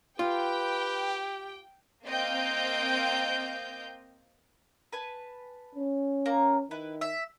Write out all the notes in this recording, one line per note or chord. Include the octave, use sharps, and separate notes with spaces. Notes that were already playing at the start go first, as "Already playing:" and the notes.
F4 G4 B4 G5
A#3 C4 D#5 F5 G5 G6
B4 G#5 A5
C#4
A#3 A#5
D#3 E4 B4
E5